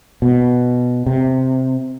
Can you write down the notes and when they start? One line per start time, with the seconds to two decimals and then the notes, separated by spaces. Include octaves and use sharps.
0.22 B2
1.06 C3